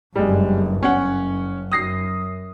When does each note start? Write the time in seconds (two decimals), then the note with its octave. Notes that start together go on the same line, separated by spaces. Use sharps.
0.16 F#1 G2 G3 G#3
0.83 F#1 C#4 F#5
1.72 F#2 D#6 A#6 C7